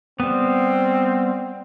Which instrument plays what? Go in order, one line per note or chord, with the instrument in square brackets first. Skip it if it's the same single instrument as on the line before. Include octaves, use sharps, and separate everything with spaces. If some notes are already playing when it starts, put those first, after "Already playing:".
[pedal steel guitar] G3 B3 [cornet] C4